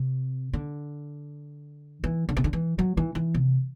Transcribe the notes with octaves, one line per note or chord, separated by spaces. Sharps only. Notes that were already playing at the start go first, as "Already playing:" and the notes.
Already playing: C3
D3
E3
D3
C3
D3
E3
F#3
E3
E3
C3